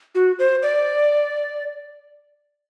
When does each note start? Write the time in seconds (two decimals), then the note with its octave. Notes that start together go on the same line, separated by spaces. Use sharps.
0.15 F#4
0.39 C5
0.63 D5